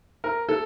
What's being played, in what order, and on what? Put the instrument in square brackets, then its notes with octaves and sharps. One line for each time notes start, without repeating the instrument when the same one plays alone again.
[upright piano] A#4
A4